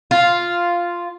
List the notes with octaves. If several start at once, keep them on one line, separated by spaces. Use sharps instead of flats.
F4